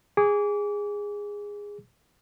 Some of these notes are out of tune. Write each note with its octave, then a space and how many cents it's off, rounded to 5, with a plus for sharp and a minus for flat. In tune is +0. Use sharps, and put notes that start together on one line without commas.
G#4 -15 D6 -30